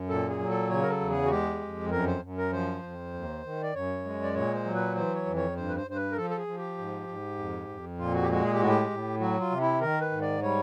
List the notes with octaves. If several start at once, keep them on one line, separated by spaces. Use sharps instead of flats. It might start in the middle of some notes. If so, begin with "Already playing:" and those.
Already playing: F#2
A#2 A4
G#4
F#3
A4
C#3 C#5
A#4
A4
E2
G#4
F#4
G#3 G4
F2
F#2 A#4
C5
F#2
A#4
F3 C5
F2
D#2
D#3
D5
F#2 C#5
G#3
D5
A#2 C#5
C5
F#3
B4
E3 C5
C#5
F2
C#5
G2 C5
B4
C5
G2 C5
B4
A#4
F3 A4
A4
G#4
F3
G4
G#2
G#2
F2
F2
A#2 F4
F#4
G4
G#3 F#4
G#4
G4
A2 F#4
G4
A2
F#3 F#4
F4
C3
E4
D#3 A#4
B4
G#2
D5
G3 C#5